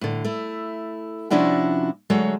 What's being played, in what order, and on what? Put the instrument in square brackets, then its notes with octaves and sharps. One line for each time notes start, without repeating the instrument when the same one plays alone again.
[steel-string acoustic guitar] A2 D3
A3 E4
C3 F3 C#4 D4 E4 F#4
D3 F#3 G#3 A3 F#4 C#5